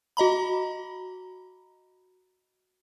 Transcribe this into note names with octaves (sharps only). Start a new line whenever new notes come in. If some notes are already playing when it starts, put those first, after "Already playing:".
F#4 D#5 A#5 B5